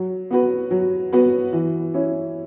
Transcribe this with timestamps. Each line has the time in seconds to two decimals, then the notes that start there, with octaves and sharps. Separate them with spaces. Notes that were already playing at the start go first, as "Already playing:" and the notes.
Already playing: F#3
0.31 B3 F#4 B4
0.71 F#3
1.12 B3 F#4 B4
1.53 E3
1.94 C#4 E4